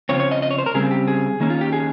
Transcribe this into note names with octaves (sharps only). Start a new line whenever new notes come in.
C#3 F3 C4 C#5
C#5
D#5
D#5
C#5
C5
A#4
C#3 G3 C4 G#4
G4
G#4
D#3 A#3 C#4
F4
G4
G#4